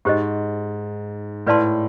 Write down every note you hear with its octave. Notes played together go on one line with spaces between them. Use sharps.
G#2 G4 C5 D#5
A2 B4 D5 F5 A5 C6